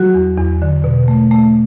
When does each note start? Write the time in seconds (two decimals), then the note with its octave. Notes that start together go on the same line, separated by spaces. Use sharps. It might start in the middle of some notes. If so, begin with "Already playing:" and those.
Already playing: F#3 F#4
0.14 E2
0.38 E2
0.62 D3
0.84 B2
1.08 A3
1.31 A3